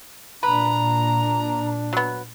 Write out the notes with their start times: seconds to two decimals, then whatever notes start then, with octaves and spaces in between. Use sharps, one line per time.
0.43 A#2 D4 B4 A#5
1.93 F#3 B3